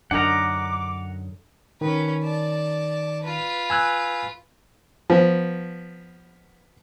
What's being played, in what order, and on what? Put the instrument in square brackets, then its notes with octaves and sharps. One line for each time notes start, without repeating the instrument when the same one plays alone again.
[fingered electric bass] F#2 [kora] D3 D#4 A#4 [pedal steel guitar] F#5 A#5 [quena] D6
[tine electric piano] D#3 [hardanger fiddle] C#4 B4
[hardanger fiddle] D5 A5
F4 B4
[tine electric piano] G#5 E6 F#6
[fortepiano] F3 B3